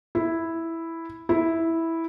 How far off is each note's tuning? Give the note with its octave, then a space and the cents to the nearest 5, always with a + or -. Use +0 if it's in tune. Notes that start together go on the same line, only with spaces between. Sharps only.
E4 +0
E4 -5